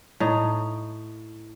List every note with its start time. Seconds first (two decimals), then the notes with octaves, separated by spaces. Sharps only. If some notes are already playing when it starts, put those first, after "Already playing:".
0.20 A2 D#4